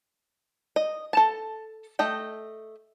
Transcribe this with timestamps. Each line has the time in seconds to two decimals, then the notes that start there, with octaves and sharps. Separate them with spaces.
0.76 D#5
1.13 A4 A5
1.99 A3 D#5 G5